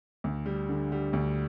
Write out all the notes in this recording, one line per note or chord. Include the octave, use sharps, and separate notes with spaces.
D2
G3
D3
G3
D2